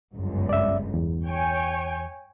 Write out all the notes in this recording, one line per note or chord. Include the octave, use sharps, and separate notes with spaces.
G1 C#2 F#2
D5 E5
E2
C#5 G5 G#5